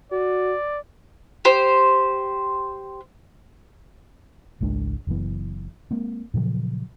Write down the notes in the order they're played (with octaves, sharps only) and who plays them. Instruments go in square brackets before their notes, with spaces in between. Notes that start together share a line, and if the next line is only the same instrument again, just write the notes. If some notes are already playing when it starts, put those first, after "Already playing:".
[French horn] F#4 [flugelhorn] D5
[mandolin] G4 C5
[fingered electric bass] G#1 C#2 G#3 D4
F#1 F#2 E3 B3
G#3 A#3 C4
A#2 C#3 F3 F#3